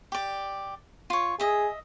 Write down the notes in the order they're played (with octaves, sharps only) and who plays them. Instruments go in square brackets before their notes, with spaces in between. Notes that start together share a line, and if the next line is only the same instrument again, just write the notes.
[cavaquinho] G4 D5
F4 C#5
[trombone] G#4 [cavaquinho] D#5 E5